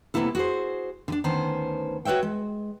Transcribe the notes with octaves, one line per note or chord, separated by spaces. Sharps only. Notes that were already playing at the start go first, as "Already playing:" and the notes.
C3 G#3 A#3 B3 E4 A4
F#4 G#4 C5
D3 D4
D2 D#3 B3 C#4 C5 A5
F#4 B4 C#5 E5 G5
G#3